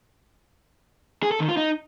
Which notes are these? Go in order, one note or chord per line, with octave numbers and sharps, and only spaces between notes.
G#4
A4
D#3
F4
D#4